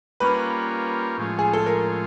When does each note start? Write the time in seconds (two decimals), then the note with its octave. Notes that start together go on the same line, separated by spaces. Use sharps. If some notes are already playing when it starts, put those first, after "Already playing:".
0.20 G3 A#3 C#4 F4 B4
1.18 A2 F3 G#3 C#4 F4
1.39 G#4
1.53 A4
1.66 A#4